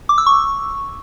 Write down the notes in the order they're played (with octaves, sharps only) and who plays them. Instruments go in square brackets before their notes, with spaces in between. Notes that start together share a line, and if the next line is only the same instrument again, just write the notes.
[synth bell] D6
E6
C#6